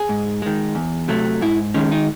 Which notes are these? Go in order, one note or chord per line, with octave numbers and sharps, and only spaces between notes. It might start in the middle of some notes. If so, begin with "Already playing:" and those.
Already playing: G#4
G#2
D#3 G#3
E2
C3 F#3 A3
G#2 E4
D#3 G#3 C#4
D#4